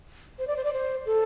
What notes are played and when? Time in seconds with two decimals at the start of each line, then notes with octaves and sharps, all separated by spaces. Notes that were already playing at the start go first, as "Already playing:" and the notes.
0.39 C5
0.47 D5
0.56 C5
0.64 D5
0.73 C5
1.06 A4